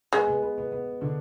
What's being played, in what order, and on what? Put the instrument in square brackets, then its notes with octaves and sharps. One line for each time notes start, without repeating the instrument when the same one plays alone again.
[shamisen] G#3 [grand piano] B3
[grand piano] B3
B3
B3
B3
D3 D4